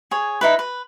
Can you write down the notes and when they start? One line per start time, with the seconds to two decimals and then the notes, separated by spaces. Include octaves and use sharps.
0.11 G#4 C#5
0.41 D#4 E4 B4
0.59 B4